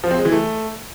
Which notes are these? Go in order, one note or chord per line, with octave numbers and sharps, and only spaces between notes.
F3
C4
G#3
E3
A3